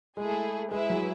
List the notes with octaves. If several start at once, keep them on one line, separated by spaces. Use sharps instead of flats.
G#3 A3 E4 G#4
G#3 E4 G#4 B4 E5
F#3